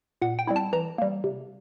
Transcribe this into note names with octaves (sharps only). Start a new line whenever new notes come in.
A#2 F#5
G5
G3 C4 E4
A5
E3 A#5
G3 A#3
C3